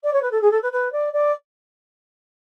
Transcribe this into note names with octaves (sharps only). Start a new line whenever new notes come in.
D5
C#5
B4
A4
G#4
A4
B4
B4
D5
D5